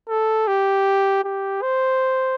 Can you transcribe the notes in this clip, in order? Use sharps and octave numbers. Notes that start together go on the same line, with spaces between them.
A4
G4
G4
C5